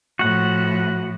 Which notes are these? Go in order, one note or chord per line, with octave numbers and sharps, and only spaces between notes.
A2 F3 F#4 F#5